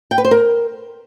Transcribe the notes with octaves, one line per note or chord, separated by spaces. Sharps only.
G5
B4
C5
A#4